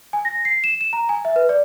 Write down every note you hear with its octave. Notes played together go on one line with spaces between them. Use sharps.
G#5
A#6
C7
E7
E7
A#5
G#5
E5
B4
D5